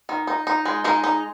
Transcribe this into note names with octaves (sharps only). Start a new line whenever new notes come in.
D#3
D#4
D#4
G#3
G#3 D#4 G#4
D#4